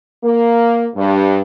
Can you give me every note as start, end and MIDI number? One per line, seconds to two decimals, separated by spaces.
0.24 0.86 58
0.96 1.39 43